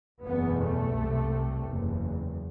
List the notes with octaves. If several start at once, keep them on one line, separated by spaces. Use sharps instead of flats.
F#1 E2 B2 B3
A3
C2
C3
F#1 E2